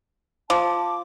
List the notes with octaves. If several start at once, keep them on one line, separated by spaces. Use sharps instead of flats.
F3 A5 D6